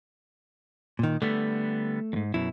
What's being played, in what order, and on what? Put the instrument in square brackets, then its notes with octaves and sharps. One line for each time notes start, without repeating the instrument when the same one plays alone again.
[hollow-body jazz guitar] A#2 D#3
[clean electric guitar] D3 G3 B3 [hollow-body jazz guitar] A3
[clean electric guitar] E2 G#2
[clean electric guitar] F#2 B2 [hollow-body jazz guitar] E4